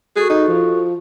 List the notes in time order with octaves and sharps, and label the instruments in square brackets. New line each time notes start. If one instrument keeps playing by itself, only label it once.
[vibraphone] F#4 A4 C#6 [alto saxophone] G#4
[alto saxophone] D#4
F3